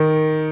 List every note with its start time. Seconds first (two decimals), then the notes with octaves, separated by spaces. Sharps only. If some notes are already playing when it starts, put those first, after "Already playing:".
Already playing: D#3